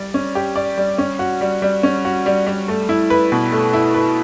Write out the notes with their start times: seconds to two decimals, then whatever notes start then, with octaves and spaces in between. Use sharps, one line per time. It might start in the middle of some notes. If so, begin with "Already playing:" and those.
Already playing: G3 D5
0.14 C#4
0.35 G4
0.56 D5
0.78 G3
0.98 C#4
1.19 F#4
1.41 G3
1.62 G3
1.83 C#4
2.05 F#4
2.26 G3
2.46 G3
2.68 A3
2.89 E4
3.10 B4
3.32 B2
3.52 A3
3.73 E4
3.94 B4